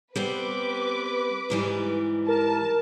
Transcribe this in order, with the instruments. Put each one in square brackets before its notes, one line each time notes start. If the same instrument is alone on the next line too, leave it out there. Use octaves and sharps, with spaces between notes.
[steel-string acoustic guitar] G3 B3 C4 [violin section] B4 D6
[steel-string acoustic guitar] G#2 E3 G3
[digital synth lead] A#4 [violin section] A5